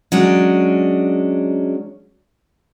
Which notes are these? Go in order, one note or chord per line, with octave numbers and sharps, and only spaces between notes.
F#3 G#3 C#4 D4